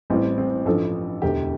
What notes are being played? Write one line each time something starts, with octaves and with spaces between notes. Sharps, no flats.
A1 A2 G3 C4
C4
A1 G2 F3 A4
E1 D2 D3 G4